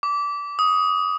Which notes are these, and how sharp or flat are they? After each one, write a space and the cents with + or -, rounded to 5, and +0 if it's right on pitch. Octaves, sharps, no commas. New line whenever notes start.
D6 -20
D#6 +10